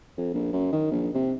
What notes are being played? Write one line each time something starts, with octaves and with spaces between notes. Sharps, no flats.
F2
A#1
F#2
D#3
A#1
C3